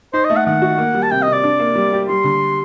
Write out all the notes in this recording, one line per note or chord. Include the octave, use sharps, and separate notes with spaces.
D#4 C5
D#5
A3
F#5
D#3 F#5
F#4
A#3
G3
A5
C3 G5
D#5
C3
D5
D4
A#3
G3
G4
G3 C6
D3